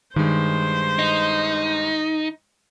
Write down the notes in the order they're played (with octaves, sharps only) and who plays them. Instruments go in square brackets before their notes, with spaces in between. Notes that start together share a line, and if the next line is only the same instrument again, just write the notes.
[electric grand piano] G2 G#3 [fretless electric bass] D#3 [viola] C5
[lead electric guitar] D#4